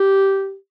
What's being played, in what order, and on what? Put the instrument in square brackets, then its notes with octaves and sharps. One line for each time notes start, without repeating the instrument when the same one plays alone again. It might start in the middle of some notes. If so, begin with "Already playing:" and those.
Already playing: [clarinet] G4